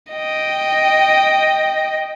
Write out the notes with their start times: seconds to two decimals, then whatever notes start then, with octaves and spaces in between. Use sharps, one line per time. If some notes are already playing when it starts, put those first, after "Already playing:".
0.13 D#5 G5